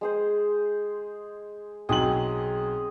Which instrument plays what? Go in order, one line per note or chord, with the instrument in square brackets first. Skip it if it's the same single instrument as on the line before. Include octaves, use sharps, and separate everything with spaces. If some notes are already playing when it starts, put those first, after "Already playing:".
[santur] G#3 G#4 C5
[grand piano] B1 F#3 F#7 [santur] C4 G#4 D#5